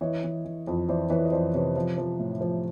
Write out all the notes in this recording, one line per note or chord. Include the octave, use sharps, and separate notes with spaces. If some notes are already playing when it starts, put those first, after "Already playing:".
E3 C#5 D#5
E3
E3
F2
E3 C5 D5
E3 B4 C#5
D#5
F2 C5 D5
C3 B4 C#5
F3
F3
A2
F3